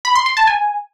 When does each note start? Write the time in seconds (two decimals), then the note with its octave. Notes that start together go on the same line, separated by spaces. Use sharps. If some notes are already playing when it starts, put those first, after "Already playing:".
0.05 B5
0.15 C6
0.26 C6
0.37 A5
0.47 G#5